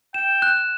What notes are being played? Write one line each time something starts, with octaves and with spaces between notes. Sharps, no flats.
G5 E7
F#6